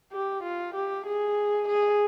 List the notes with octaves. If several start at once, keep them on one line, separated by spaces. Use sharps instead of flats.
G4
F4
G4
G#4
G#4